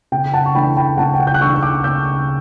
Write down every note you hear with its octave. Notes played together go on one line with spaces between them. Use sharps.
C#3 G5
F#5 A5
C#6
E3 A3 D4 G5 B5
G5 B5
C#3 F#5 A5
G5
F#5
G6
F#6
E3 A3 D4 C#6 E6
E6
D6 F#6
C#3 E6 G6